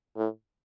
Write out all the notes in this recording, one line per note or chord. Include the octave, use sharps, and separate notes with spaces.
A2